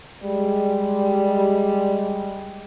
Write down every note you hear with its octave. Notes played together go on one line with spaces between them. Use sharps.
G3 G#3